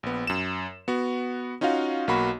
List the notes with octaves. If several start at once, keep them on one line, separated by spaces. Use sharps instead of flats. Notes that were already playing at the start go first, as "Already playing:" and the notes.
A#1 B3
F#2 E7
B3 F#4
C#4 D#4 F4 F#4 F5
B1 A#3 F#4 B5